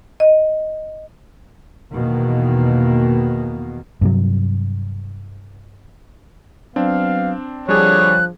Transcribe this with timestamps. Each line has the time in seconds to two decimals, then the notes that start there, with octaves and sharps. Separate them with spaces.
0.20 D#5
1.92 E2 B2 D#3 A#3
4.01 G2 C3 F#3
6.76 F#3 B3 C4 D4 F5
7.69 D3 F3 G3 D4 G#4 C#5 F#6